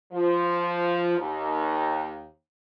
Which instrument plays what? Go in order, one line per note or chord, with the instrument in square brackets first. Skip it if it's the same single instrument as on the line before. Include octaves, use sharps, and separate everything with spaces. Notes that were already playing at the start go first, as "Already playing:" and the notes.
[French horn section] F3
D#2